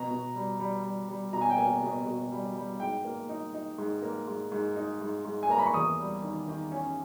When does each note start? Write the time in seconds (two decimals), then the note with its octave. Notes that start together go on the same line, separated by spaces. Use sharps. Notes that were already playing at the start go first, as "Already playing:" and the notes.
Already playing: B2 A#5
0.11 B2
0.35 G3
0.60 G3
0.84 G3
1.09 G3
1.33 B2 A#5
1.41 G#5
1.50 G5
1.58 A#3 G#5
1.82 B2
2.06 B2
2.32 G3
2.56 G3
2.80 G#2 G5
3.05 A#3
3.29 D#4
3.54 D#4
3.78 G#2
4.02 A#3
4.27 G#2
4.52 G#2
4.76 D#4
5.01 G#2
5.25 G#2
5.43 G#5
5.49 A#3 A#5
5.59 B5
5.66 C#6
5.74 E2 D#6
5.99 G3
6.23 D#3
6.48 D#3
6.72 C#4